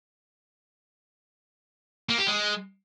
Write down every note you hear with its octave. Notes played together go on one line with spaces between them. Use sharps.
A#3
G4
G#3